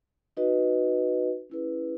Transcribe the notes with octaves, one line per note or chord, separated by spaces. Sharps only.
D#4 F#4 B4 D#5
C#4 E4 G#4 B4